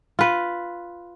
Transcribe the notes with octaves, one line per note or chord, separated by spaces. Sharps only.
F4 B4